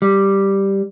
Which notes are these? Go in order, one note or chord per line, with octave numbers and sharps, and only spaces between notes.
G3